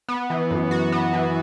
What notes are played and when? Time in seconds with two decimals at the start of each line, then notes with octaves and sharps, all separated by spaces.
0.08 B3
0.30 E3
0.51 F#2
0.71 F#4
0.92 B3
1.14 E3